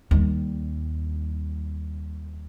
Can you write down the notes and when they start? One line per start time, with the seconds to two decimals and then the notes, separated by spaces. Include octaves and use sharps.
0.11 D#2 G3